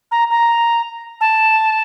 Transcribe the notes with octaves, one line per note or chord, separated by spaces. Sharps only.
A#5
A#5
A5